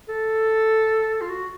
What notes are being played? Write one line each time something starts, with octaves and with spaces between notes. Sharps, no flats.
A4
F4
F#4